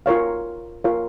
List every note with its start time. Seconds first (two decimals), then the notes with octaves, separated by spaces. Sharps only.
0.06 F4 A#4 C#5 F5
0.84 F4 A#4 C#5 F5